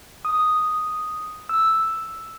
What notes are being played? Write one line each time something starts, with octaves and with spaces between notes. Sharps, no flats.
D#6
E6